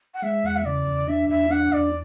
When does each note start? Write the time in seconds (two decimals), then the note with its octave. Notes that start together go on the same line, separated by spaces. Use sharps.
0.14 F#5
0.22 G#3 E5
0.44 E2 F#5
0.56 E5
0.65 C#3 D5
0.87 E2
1.07 D4 E5
1.29 E2 E5
1.50 D4 F#5
1.72 E2 D5